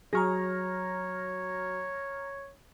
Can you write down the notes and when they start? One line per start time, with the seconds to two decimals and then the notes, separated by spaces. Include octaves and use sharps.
0.13 F#3 G#4 C#5 A#5 C#6 F6 A#6